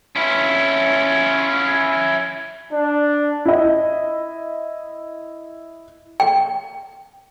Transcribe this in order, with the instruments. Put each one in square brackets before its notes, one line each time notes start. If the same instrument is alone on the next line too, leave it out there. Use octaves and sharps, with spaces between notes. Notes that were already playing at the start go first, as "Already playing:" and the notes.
[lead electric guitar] C#4 E4
[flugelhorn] D4
[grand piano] E4 D#5
[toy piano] G5